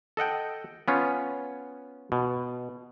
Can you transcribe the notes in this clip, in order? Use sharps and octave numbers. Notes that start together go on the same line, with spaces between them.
A4 D#5 F#5 G5
B3 C#4 F4
B2